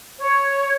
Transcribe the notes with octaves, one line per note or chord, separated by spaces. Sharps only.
C#5